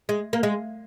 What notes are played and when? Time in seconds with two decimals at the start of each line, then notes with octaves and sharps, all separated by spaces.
0.09 G#3
0.33 A#3
0.43 G#3